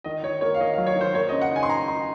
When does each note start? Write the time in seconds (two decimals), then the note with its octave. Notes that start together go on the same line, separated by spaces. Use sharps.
0.04 D#3 D#5
0.23 D#3 C#5
0.41 A#3 C#5
0.54 F5
0.60 D#3 D#5
0.74 F5
0.78 F#3
0.86 C#5
0.96 D#3
1.01 C5
1.14 A#3 C#5
1.29 D#5
1.32 C#3
1.41 F#5
1.51 D#4 G#5
1.63 C6
1.69 D#4 A#5
1.88 D#4 C6